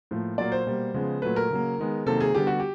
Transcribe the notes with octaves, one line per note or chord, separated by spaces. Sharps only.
A2 F3 A#3
A#2 F#3 A#3 D5
C5
B2 G3 A#3
C#3 F3 G#3 B3
A#2 F#3 A3 B4
A#4
C#3 F#3 A#3
D#3 G#3 B3
C3 D#3 F#3 A#3 A4
G#4
D3 G3 B3 G4
F#4
G4